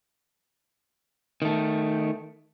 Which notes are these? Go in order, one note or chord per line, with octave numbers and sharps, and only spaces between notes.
D#3 A3